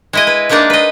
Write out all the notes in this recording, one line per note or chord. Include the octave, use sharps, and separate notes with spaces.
G#3 E4 D#5
B4
G#3 A#3 D4 D#4 D5
B4 D#5